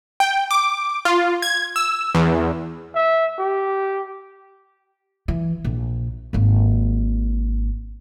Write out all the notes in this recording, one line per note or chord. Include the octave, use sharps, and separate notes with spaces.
G5
D6
F4
G#6
E6
E2
E5
G4
E3
A#1
G#1 A#3